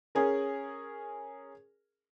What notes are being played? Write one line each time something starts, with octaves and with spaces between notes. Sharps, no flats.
C#4 G#4 A#4